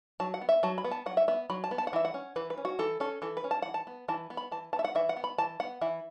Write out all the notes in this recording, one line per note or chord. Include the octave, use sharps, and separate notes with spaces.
F#3 A5
F#5
B3
E5
F#3 A5
B5
B3
A5
F#3 F#5
E5
B3 E5
F#3 B5
A5
B3
A5
F#5
E3 E5
F#5
C#4
E3 B4
B4
C#4
F#4
E3 A4
C#4 A4
E3 A4
B4
C#4
A5
E3 F#5
A5
B3
E3 A5
B3
B5
E3 A5
B3 A5
E5
F#5
E3 E5
F#5
B3
B5
E3 A5
B3 F#5
E3 E5